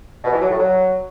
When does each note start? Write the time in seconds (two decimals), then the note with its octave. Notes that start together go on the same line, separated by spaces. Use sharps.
0.24 B2
0.33 E3
0.42 F#3
0.50 A2
0.59 F#3